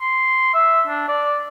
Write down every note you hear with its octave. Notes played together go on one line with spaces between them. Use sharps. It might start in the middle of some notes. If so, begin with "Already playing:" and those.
C6
E5
D4
D5